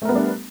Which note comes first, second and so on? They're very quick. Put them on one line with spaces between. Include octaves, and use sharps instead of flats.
A3 A#4 B3 G3 D4